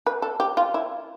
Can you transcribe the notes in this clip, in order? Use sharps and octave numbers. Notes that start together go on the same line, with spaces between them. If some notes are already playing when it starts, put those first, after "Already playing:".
B4
A4
G4
F4
E4